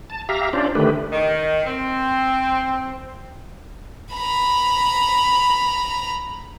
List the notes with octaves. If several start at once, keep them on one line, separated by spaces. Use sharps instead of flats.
A5
G4 E5 F5 A#5
C#4 D4 F4 C5 D5
D3 D#3 A3 G4 B4
D#3
C4
A#5 B5